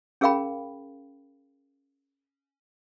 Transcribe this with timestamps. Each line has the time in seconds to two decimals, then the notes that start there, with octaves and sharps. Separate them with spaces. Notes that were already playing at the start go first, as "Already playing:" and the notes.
0.21 C#4 G#4 A#4 F5 G5 B5